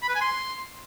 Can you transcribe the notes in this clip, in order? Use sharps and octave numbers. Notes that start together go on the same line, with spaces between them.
B5
B4
G#5
C6